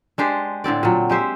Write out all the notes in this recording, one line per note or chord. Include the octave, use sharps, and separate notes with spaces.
G#3 D4 G4 C5
A2 D3 C4 D5
A#2 F#3
G#3 G4 C5 E5